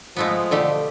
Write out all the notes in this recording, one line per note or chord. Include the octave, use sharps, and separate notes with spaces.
F3 G#3 A3 B3
B2 D3 A3 G4